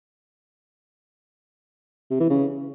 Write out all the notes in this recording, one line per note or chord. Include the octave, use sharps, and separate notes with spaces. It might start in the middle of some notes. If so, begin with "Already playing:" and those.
C3
E3
C#3